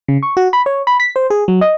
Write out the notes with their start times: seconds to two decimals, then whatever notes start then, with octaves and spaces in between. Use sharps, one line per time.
0.08 C#3
0.23 C#6
0.37 F#4
0.53 B5
0.66 C#5
0.87 B5
1.00 B6
1.16 C5
1.30 G#4
1.48 F#3
1.61 D#5